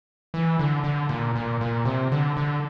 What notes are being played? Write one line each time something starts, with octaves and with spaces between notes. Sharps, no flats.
E3
D3
D3
A#2
A#2
A#2
C3
D3
D3